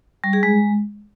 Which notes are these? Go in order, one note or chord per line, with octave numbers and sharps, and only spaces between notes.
G3
G#4
G#3